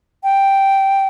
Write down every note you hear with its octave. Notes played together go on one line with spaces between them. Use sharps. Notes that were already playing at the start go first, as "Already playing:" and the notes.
G5